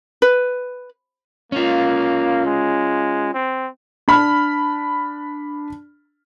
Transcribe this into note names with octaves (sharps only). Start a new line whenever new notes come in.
B4
A#3 C#4 F4
G#3
C4
D4 B5 F6